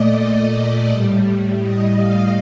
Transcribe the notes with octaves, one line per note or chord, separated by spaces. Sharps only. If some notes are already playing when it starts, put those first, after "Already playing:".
Already playing: A#2 A3 D5 D#5
D#5
A2 G3
D#5
F5